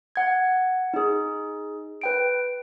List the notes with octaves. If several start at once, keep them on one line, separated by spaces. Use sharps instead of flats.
F#5 G#6
D#4 G#4
B4 G5 D7